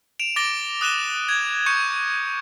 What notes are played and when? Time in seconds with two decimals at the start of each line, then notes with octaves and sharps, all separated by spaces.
0.19 D7 E7 F7
0.36 D6 A6 A#6 D7 G7
0.81 D#6 F#6 D#7 E7 G7
1.29 G#6
1.66 C#6 G6 C#7